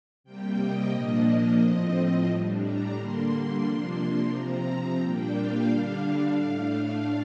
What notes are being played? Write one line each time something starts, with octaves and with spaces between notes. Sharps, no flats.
C3 G3 A#3 G5
D#5
A#2 F3 A#3 D4 D#5
A2 F3 C4
A2 G3 D4
A#5
D3 G3 A#3 D4 C6
C3 F3 A#3 D4
C3 F3 C4 A#5
A#2 G3 A#3 D4 G5
F5
D3 G3 D4 F5
A2 A3 D4